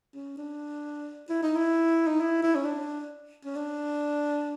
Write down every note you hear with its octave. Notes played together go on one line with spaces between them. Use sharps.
C#4
D4
E4
D#4
E4
D#4
E4
E4
C#4
D4
C#4
D4